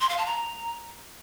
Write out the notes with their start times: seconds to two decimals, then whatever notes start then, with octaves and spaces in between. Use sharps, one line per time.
0.01 C6
0.09 F5
0.18 A5
0.26 A#5